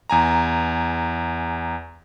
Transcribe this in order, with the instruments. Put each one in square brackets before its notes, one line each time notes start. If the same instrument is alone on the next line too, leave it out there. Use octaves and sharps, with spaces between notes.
[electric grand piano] E2 G#5 A#5